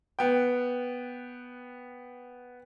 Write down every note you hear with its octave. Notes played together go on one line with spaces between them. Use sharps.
B3 G5